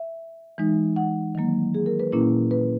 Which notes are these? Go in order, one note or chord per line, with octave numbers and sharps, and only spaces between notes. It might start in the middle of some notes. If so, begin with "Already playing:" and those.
Already playing: E5
E3 G#3 D#4
F#5
D#3 F#3 A#3
G#4
A#4
B4
A#2 A#3 C#4 E4
B4